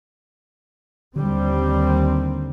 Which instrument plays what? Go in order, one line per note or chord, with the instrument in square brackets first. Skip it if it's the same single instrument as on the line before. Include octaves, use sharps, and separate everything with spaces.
[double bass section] D#2 G3 C4 [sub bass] D3